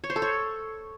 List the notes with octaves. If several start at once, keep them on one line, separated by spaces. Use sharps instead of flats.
C#5
C5
A4
C#5